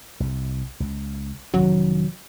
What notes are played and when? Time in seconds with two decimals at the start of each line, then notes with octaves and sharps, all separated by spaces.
0.20 C2
0.80 C#2
1.54 F1 D#3 F#3 C#4